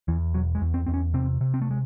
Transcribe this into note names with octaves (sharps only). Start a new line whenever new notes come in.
E2 E3
E1 F#3
G#3
E2
C4
E2 C4
C#4
C3 C4
C3
C4
A3
G#3